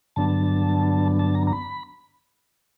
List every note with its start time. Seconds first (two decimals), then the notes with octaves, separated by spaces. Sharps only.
0.16 G2 D3 F#3 B3 D4 A5
1.19 A5
1.35 A#5
1.47 A#5
1.53 B5